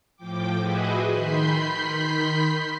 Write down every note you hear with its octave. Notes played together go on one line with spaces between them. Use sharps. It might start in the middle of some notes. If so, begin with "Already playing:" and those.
A2 F3 G5 D6
F#4 G#4 B4 D#5 E5 G#5
D#3 B5 C6 G6 B6 C7